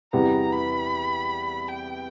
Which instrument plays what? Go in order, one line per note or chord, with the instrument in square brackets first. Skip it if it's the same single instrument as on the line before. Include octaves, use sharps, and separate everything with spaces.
[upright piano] E2 C3 E3 G3 B3 [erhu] A#5
[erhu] B5
G5